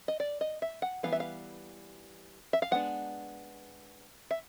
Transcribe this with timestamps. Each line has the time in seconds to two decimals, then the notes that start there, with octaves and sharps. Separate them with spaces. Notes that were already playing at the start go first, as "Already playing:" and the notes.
0.08 D#5
0.20 D5
0.41 D#5
0.62 E5
0.82 F#5
1.03 E3 G3 B3 F5
1.12 E5
1.20 F5
2.53 E5
2.62 F5
2.71 G#3 B3 D4 F#5
4.31 E5